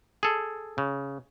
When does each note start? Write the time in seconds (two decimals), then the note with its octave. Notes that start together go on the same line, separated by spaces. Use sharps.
0.23 G#4 A4
0.78 C#3